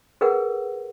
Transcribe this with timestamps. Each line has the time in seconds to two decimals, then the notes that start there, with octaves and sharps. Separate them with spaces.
0.21 G#4 A#4 B4 F#5